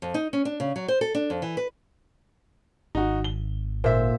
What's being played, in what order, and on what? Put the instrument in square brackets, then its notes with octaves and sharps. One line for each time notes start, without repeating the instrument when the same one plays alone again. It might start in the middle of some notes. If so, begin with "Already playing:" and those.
[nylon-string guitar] F2
D#4
C#4
D4
C#3
F#3
C5
A4
D4
F2
E3
B4
[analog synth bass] G#1 [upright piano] D#4 F#4
[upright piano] G7
[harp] A#2 [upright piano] C5 E5